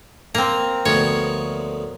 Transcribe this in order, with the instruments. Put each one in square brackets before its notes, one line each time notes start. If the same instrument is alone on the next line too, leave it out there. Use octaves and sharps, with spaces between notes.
[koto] A#3 C4 [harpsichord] A#5
[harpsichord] D2 F3 B3 [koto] C#5